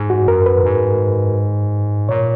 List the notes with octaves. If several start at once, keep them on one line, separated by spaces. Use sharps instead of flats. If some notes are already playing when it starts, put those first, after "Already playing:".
Already playing: G#2
F#4
F#2 A#4
B4
G#2
A#2 C#5